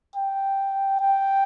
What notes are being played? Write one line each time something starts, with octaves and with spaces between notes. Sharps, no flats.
G5
G5